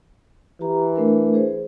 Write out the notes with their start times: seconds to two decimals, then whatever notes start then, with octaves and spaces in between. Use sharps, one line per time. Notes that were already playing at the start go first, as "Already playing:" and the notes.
0.61 E3 G4 A#5
0.96 A3 D4 A#4
1.34 G#4 C5